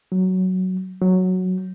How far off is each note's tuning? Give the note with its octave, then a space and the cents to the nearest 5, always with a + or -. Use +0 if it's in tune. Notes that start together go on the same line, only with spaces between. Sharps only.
F#3 +5
F#3 -5